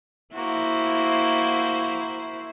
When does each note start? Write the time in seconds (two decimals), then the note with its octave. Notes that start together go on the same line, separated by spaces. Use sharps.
0.34 A#3 E4 F#4 C5